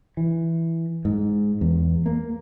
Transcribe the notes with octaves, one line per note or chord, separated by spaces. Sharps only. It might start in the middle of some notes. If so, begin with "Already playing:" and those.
E3
G#2
E2
A#3